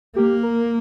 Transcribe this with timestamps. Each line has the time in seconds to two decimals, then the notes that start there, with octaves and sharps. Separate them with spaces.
0.16 A#3 G4
0.43 A#4